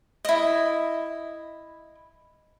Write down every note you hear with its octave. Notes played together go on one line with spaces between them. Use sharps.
E4 D#5